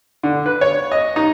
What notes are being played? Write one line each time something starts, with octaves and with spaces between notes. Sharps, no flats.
D3
B4
C#5
D#5
D#4